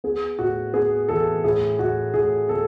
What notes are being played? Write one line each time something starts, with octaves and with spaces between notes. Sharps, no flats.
B3 G#4
A2 F#4
B3 G#4
E3 A4
A2 G#4
A2 F#4
A2 G#4
B3 A4